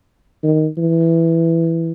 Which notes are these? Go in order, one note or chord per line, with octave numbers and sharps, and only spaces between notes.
D#3
E3